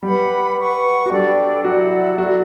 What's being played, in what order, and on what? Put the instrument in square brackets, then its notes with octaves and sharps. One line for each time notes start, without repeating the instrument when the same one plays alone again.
[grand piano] G3 G4 [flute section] B4 F#5 B5
[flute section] B4 F#5 C#6
[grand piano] F#4
[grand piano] G3 G4 [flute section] D4 A4 D5 G5
[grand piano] F#3 F#4 [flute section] E4 G4 D5 F#5
[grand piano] F#3 F#4 [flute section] E4 A4 D5